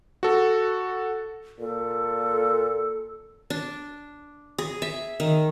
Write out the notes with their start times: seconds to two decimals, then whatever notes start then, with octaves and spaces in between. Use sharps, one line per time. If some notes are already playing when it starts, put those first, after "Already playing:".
0.23 F#4 A4
1.59 A#2 A4
3.50 D4
4.58 G#4
4.82 E5
5.20 D#3